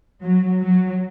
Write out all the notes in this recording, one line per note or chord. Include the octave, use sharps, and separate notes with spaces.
F#3
F#3